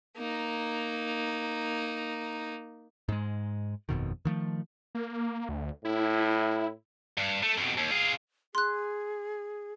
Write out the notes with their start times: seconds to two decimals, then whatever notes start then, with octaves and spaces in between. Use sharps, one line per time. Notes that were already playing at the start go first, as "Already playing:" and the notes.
0.17 A#3 D#4
3.09 G#2 G#3
3.89 G1 F2 B2 D#3
4.25 D#3 F3 A3
4.95 A#3
5.49 D2
5.85 A2 E4
7.18 G2
7.43 A3
7.58 F2 B2
7.77 D#2
7.91 F4 G#4
8.55 G#4 C6 F#6